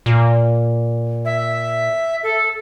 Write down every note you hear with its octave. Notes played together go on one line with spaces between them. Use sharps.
A#2
E5
A4